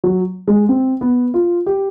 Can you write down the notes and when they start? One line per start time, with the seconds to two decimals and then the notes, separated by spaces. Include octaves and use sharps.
0.04 F#3
0.48 G#3
0.69 C4
1.01 B3
1.34 F4
1.66 G4